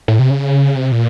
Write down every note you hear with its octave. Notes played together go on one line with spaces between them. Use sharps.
A2
C3
C#3
C3
A#2